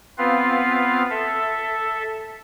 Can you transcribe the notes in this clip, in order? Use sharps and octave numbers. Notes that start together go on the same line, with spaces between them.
B3 C4 F4 B4 F5
A4 E5